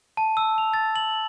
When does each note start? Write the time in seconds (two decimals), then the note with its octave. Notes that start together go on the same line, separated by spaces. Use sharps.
0.17 A5
0.37 E6
0.58 F7
0.74 A6
0.96 F#7